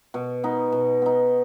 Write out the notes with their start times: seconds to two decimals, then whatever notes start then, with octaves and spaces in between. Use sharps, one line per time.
0.14 B2
0.44 B3 D#4
0.72 B2
1.02 B3 D#4